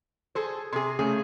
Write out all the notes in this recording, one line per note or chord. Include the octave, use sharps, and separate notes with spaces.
G#4 A4 C5
C3 G#4 C6
C#3 A3 G#4